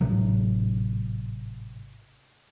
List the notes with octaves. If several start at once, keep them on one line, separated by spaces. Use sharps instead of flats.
G#1 A2 C3 F#3